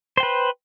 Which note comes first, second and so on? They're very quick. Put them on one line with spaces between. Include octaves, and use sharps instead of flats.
C5 G5 B4